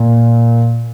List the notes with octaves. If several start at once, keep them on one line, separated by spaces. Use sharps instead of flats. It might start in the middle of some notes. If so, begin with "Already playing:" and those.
Already playing: A#2